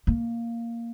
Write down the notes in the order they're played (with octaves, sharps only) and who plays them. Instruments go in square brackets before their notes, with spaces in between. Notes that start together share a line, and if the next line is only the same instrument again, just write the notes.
[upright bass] A#3